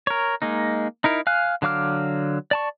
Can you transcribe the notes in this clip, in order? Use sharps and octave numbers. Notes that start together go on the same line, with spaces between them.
A#4 C#5
G#3 A#3 D#4
D#4 E4 A#4
F5 G#5 F6 F#6
D3 F#3 F5 D6 F6
D5 A5 C#6